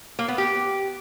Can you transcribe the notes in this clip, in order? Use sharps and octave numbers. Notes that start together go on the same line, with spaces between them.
A#3
B3
G4